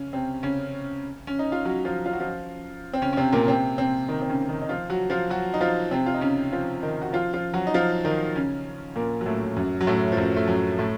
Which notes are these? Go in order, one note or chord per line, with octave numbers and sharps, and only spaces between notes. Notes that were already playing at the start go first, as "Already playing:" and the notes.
Already playing: C#3 C#4
C3 C4
C#3 C#4
C#4
D#4
F4
F#3 F#4
F3 F4
F4
F#4
F3 F4
C4
C#3 C#4
C#4
C3 C4
A#2 A#3
C3 C4
C3 C4
D#3 D#4
C4
C#3 C#4
D#3 D#4
D#4
F3 F4
F#3 F#4
F3 F4
F#3 F#4
D#4
F3 F4
C3 C4
F4
D#4
C#3 C#4
F3 F4
D#3 D#4
F#4
F3 F4
F3 F4
F#3 F#4
D#4
F3 F4
D#3 D#4
C#3 C#4
A#2 A#3
F#3
A2 A3
F#2 F#3
F#3
A2 A3
F3
F#2 F#3
A3
F#2 F#3
A2 A3